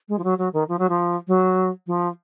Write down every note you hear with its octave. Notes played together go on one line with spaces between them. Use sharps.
G#3
F3
F#3
F#3
D#3
F3
F#3
F3
F#3
F3